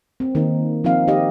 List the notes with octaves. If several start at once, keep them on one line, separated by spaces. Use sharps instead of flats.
C4
D#3 A#3 D#4
F3 C4 D#4 F5
D#4 G4 D#5